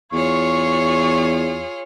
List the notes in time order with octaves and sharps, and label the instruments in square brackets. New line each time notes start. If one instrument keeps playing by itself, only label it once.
[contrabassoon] E2 [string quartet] F4 G#4 C#5 [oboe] C#6